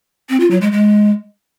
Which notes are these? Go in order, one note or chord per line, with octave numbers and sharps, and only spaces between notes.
C4
F4
F#3
G#3
G#3